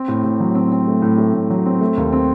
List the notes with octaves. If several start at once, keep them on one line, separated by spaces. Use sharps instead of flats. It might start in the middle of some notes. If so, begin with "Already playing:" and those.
Already playing: C4
A2
A2
F#3
C4
C4
A3
A2
A3
A2
F#3
C4
A3
D#2
C4